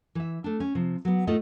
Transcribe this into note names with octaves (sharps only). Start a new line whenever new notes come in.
E3 E5
A3 D4
C#4
C3 F3
F#3 B3
A2 A3 D#4 F4 D#5